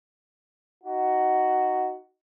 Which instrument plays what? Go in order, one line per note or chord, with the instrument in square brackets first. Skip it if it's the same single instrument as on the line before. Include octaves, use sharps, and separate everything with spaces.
[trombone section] D#4 F#4